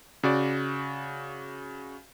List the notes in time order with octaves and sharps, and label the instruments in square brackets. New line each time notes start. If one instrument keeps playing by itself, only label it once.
[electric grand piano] C#3 F#4 D5